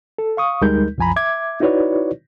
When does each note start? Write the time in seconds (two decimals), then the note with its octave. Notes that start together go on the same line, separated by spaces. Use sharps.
0.18 A4
0.37 F5 C#6 D#6
0.61 D2 G3 G#3 D#4 A#4 G6
0.98 C2 F#2 F3 G#5 A#5 B5
1.16 E5 D6 G#6
1.60 D#4 E4 F#4 B4 C#5 D5